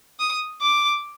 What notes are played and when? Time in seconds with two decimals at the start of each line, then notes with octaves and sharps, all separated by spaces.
0.20 D#6
0.62 D6